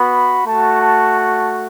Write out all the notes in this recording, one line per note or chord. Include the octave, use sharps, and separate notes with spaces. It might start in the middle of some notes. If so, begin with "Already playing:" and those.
Already playing: B3 F#4 B5
A3 F#4 A5
A5
A5